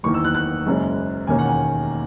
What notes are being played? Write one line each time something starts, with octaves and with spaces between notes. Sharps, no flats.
F#1 E2 D#3 A#3 C#6
E6
F#6
F#6
F#1 F#2 C#3 G#3 C#4
E1 D#2 D#3 A#3 C#4 G#5
F#5
G#5